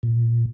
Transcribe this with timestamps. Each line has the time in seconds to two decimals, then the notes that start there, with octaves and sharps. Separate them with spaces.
0.03 A#2